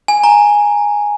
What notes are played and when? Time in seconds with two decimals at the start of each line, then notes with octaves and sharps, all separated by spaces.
0.08 G#5
0.24 A#5